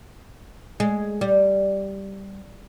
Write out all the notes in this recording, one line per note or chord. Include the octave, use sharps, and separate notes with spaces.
G#3
G3